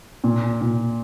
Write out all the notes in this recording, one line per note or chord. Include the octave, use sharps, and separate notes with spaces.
A#2
A#2